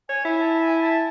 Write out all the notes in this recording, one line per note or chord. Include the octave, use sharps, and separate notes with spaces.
C#5 G#5
E4
A5
G#5
A5